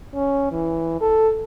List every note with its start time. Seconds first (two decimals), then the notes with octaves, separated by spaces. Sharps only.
0.14 C#4
0.51 E3
1.01 A4